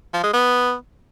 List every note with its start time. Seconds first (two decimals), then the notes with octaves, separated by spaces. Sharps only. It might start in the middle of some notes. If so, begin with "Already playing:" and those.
0.14 F3
0.24 G#3
0.34 B3